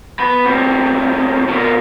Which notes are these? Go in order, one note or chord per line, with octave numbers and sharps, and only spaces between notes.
B3 B5
D2 C3
B2 A#3